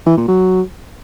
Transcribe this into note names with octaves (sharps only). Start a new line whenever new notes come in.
E3
A#2
F#3